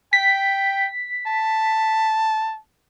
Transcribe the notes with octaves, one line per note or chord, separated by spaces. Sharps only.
G5 B6
A5